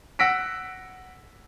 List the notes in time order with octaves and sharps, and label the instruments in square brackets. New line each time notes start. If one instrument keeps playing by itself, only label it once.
[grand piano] F#5 E6 A#6 B6 D7